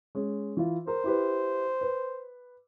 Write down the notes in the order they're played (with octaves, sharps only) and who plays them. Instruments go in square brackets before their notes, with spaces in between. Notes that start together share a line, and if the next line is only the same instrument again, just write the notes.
[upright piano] G#3 C#4
E3 E4 F4
[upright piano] A#4 [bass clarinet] C5
[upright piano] E4 G4 B4
B4